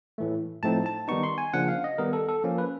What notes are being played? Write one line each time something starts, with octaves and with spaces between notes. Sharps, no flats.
A2 E3 A3
A2 F3 A3 C4 D#4 A5
A5
D#3 G3 B3 D#4 C#6
C6
G#5
C#3 F3 A#3 D4 F#5
F5
D#5
D#3 G3 B3 A#4
A4
A4
F3 A#3 C#4
B4